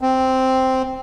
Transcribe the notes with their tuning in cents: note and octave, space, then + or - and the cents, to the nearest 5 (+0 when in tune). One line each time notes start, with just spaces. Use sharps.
C4 -5